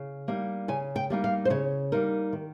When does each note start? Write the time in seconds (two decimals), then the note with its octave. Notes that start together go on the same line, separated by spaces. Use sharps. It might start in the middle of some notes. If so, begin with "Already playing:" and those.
Already playing: C#3
0.28 G3 A#3 D#4
0.68 C#3 G#5
0.96 G5
1.10 G3 A#3 D#4
1.24 F5
1.45 C5
1.50 C#3 C#5
1.92 G3 A#3 D#4 A#4
2.33 D#3